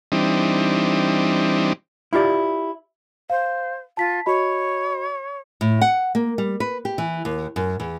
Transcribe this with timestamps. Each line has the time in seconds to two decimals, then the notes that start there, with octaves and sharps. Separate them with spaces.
0.12 E3 G3 C4 D4 D#4
2.13 E4 F4 G4 D5
3.30 C5 F5
3.97 F4 A5 B6
4.26 F#4 C#5 D#5 B5
5.61 A2
5.81 F#5
6.15 A#3
6.38 G3
6.60 B4
6.85 G4
6.98 E3
7.25 D#2
7.56 F#2
7.80 E2